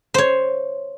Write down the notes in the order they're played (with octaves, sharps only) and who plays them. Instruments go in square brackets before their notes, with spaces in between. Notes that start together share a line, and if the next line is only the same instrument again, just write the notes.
[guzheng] C5 C#5